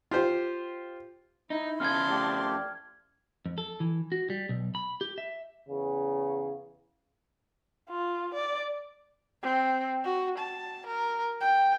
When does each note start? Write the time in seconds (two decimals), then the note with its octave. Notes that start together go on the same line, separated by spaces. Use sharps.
0.11 F4 G4 C5
1.50 D#4 E4
1.80 F2 C#4 F5 A5 C6 F6 G#6
2.09 A3 G4 D5
3.46 F2
3.58 A4
3.80 E3
4.12 F#4
4.30 G3
4.49 B1
4.75 B5
5.01 G4
5.18 E5
5.68 E2 C#3
7.89 F4
8.34 D5
9.43 C4
10.04 F#4
10.38 A5
10.87 A#4
11.41 G5